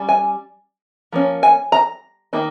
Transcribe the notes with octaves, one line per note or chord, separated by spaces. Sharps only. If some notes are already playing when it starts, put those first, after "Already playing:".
Already playing: G3 C#4
G#5
F3 A#3 C#4
G#5
A#5
D#3 A#3 D#4